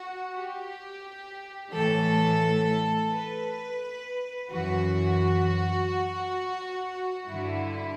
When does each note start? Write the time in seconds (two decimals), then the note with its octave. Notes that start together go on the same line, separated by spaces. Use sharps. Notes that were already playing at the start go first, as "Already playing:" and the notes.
Already playing: F#4
0.35 G4
1.74 A2 E3 A4
3.11 B4
4.50 F#2 E3 F#4
7.27 G2 D3 E4